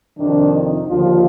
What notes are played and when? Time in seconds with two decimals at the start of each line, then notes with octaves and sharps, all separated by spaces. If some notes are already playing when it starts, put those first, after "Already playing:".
0.18 F2 C3 D#3 D4
0.53 D#4
0.87 D#2 D3 F3 D4 F4